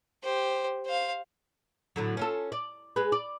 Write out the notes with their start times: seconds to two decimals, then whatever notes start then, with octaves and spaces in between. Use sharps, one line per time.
0.23 G4 C5
0.85 C5 F5
1.96 A2 D3 F#3
2.17 C#4 F4 A4
2.52 D5
2.96 G#3 G#4 B4
3.12 D5